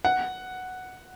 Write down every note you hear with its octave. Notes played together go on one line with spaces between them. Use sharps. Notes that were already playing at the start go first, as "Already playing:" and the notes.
F#5